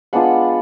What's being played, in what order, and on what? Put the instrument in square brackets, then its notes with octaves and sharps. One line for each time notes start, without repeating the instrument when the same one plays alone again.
[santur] G#3 B3 D4 F4 F#5